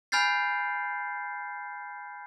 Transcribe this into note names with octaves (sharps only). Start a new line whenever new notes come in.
G#5 B5 F6 G6 A6 C7